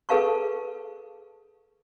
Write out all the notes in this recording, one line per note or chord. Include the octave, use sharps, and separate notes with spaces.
G#4 A4 B4 F5 A5 C#6